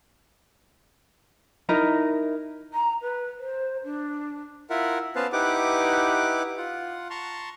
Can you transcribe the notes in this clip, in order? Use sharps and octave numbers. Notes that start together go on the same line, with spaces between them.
D#4 E4 A#4 A#5
A#5
B4
C5
D4
E4 F4 A#4 E5 F#5
B3 C#4 B4 C5 F5 A5
D#4 E4 G4 B4 F#5 D6
F4 F#5
A5 A#5 C6 C#6